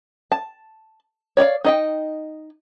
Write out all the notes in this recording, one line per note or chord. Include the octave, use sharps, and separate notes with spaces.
A5
C#5 D5 E5 F5
D#4 D#5 G5